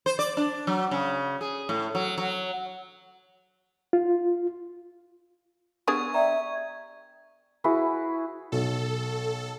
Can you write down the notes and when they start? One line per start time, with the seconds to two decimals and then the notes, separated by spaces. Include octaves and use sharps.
0.06 C5
0.19 D5
0.37 D4
0.67 F#3
0.91 C#3
1.41 G#4
1.69 A2
1.95 F#3
2.18 F#3
3.93 F4
5.88 B3 D4 G4 G#4 A#4 C#6 G#6
6.14 D5 E5 G5 A#5
7.64 E4 F#4 G#4 B4
8.52 B1 A4